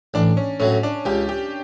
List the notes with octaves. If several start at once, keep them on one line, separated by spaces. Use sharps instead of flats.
A1 D4
C#4
A2 F#3 C#4
D4
C#2 G4
G4